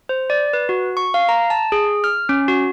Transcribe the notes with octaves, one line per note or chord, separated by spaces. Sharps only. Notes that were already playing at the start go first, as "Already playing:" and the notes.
C5
D5
B4
F#4
C#6
F5
A#5
A5
G#4
F6
C#4
F#4